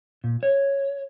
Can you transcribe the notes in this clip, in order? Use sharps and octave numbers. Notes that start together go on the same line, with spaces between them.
A#2
C#5